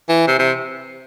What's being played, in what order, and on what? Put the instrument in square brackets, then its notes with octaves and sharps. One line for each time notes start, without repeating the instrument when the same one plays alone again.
[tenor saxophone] E3
C3
C3